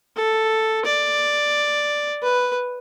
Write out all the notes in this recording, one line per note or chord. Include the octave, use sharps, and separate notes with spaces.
A4
D5
B4